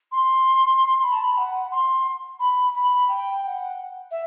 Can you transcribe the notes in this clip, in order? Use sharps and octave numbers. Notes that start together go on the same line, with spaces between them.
C6
B5
A5
B5
F#5
C6
B5
B5
G5
G5
F#5
E5